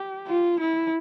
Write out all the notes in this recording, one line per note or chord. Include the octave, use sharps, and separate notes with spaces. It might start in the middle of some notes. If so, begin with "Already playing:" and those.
Already playing: G4
F4
E4